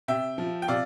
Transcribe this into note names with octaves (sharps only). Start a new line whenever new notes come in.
C3 E5 G5
F3
G5
C3 D5 F5